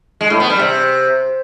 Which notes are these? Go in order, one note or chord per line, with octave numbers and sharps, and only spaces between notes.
G#3
A2
B3
G3
C3